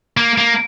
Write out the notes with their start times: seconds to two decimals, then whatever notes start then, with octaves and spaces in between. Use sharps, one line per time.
0.17 A#3
0.38 A#3